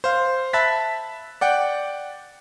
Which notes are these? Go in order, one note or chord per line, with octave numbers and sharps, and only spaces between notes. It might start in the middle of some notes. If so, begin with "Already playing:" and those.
C5 F5
E5 A5 B5 F#6 A6 B6
D5 F#5 G5